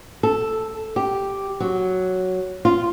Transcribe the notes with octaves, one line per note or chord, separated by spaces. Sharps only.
A4
G4
F#3
F4